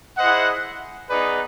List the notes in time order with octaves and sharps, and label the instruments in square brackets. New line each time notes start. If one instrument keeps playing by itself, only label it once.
[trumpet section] E4 G#4 C5 D#5 F#5
B3 D#4 G#4 B4 D5